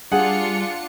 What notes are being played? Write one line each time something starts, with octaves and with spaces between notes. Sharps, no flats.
G3 D4 F4 G#4 F#5 C#7